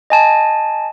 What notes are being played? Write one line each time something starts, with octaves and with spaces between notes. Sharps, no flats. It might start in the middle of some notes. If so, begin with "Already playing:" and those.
D#5 G#5 A5